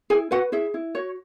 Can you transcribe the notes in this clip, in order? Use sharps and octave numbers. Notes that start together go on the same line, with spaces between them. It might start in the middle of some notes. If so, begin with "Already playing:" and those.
E4 G#4 G#5
F#4 B4 F#5
E4 G#4 E5
E4
F#4 C#5